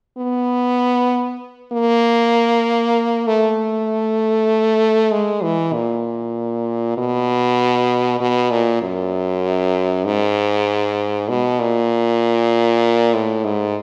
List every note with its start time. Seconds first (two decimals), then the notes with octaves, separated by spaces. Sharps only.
0.18 B3
1.72 A#3
3.27 A3
5.12 G#3
5.43 E3
5.74 A#2
6.97 B2
8.20 B2
8.51 A#2
8.82 F#2
10.05 G#2
11.29 B2
11.60 A#2
13.14 A2
13.45 G#2